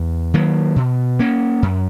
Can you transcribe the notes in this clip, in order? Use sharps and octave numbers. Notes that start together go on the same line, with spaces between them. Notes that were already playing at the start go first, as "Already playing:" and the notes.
Already playing: E2
D#3 F#3 A#3
B2
A#3 C#4
F#2